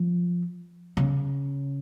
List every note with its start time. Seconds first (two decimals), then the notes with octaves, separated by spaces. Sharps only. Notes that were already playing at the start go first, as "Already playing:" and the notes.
Already playing: F3
0.97 C#3